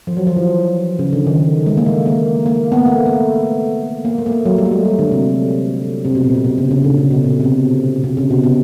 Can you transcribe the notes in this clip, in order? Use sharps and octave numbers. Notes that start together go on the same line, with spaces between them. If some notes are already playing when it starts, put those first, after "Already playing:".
F3
F#3
F3
E3
C#3
D3
D#3
G#3
A#3
A3
A#3
A#3
B3
A#3
A3
A3
A#3
A3
A#3
A3
F#3
G3
A3
G#3
G3
D3
C3
C3
B2
A#2
B2
A#2
B2
C#3
C#3
D3
C#3
B2
A#2
C3
B2
C3
C#3
B2
B2